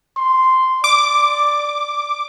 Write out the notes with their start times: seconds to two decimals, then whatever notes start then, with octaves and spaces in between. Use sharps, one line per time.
0.17 C6
0.84 D5 D6